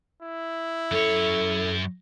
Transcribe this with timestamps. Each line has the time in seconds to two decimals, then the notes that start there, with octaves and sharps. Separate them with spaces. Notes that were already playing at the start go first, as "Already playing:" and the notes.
0.22 E4
0.92 F#2 A4 C#5